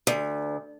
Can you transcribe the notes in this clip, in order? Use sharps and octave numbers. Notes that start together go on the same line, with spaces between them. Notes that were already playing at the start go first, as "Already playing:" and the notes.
D2